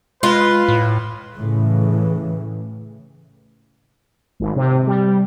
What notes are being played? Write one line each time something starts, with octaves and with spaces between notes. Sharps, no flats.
G#3 F4 B4
A2
A2 C#3 E3
G#1
C3
G3